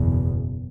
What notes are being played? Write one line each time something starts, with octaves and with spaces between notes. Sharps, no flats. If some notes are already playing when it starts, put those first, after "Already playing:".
Already playing: F#1 E2 B2